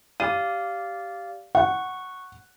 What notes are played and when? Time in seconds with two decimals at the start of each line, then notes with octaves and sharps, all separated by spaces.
0.20 G4 D5 F5 D#7
1.55 F#5 C#6